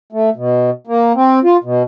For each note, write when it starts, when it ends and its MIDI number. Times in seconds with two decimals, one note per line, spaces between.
0.12 0.30 57
0.36 0.70 47
0.87 1.13 58
1.15 1.39 60
1.44 1.57 65
1.64 1.83 47